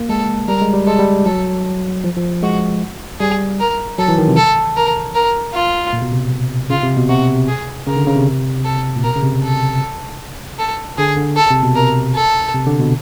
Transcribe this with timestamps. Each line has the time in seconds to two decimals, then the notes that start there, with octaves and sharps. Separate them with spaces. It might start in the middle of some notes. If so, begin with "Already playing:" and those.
Already playing: A#3
0.09 G#3 A4
0.48 G3 A#4
0.62 G#3
0.73 G3
0.87 G#3 A4
0.99 G3
1.26 F#3 A4
2.04 F3
2.17 F3
2.43 G#3 F#4
3.20 G3 G#4
3.60 A#4
3.98 F#3 A4
4.08 E3
4.18 D#3
4.28 C3
4.37 A4
4.77 A#4
5.15 A#4
5.54 F4
5.93 A#2
6.02 B2
6.12 C3
6.70 C#3 F4
6.83 C3
6.97 B2
7.09 C3 F#4
7.48 G#4
7.87 C#3 A#4
7.96 D3
8.07 C#3
8.16 C3
8.65 A4
8.96 A#2
9.04 B2 A#4
9.16 C#3
9.23 C3
9.43 A4
10.59 A4
10.98 D3 G#4
11.17 D3
11.37 A4
11.51 C3
11.63 B2
11.76 C3 A#4
12.15 A4
12.54 C3
12.66 D3
12.80 B2